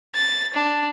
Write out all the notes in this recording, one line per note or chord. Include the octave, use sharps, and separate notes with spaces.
A6
D4